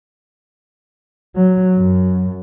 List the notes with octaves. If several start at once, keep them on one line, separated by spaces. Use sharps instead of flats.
F#3
F#2